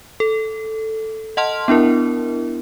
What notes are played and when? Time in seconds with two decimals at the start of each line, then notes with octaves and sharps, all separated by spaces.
0.20 A4
1.37 D#5 F#5 A5 C6 F6
1.68 B3 D4 E4 A#4